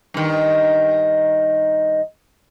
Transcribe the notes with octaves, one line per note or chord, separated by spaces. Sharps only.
G2 D#3